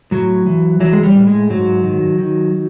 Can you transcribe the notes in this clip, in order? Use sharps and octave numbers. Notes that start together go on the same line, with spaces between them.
A2 F#3
E3
E3 F#3
G#3
G3
A2
G#3
G#2 F#3
D#3
D#3